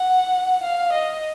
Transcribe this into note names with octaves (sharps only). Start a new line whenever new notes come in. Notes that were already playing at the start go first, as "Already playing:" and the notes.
Already playing: F#5
F5
D#5